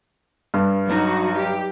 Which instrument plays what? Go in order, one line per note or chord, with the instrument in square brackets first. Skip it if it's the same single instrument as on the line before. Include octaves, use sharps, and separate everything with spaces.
[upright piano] G2
[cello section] F#3 D#4 F#4
G4